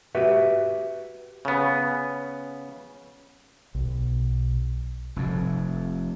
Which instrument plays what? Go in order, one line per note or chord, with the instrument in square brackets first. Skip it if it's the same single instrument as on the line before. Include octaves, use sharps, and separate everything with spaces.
[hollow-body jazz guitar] F#4 G4 B4 E5
[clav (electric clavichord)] C#3 B3
[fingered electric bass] B1
[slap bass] F1 F2